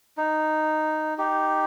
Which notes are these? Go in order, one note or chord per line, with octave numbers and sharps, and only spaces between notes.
D#4
D#4 G4